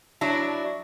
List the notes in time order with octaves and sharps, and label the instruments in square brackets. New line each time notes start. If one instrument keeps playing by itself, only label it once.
[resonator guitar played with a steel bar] F#3 D4 E4